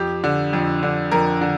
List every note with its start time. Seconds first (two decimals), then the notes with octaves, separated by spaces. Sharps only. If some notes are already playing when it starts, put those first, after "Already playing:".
Already playing: F2 G4
0.24 D3
0.53 F2
0.83 D3
1.12 F2 A#4
1.41 D3